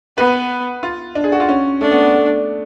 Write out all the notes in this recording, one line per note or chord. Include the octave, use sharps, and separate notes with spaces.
B3 B4
F4
D4
G#4
F#4
F4
C#4
A3 D4
B3
B3
A3